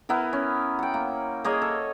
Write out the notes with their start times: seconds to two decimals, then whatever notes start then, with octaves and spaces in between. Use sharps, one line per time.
0.09 B3 E4 A#4
0.33 C#4
0.79 F#5 G5
0.94 A#3
1.44 A#3 G#4 C#5 D#5
1.62 A4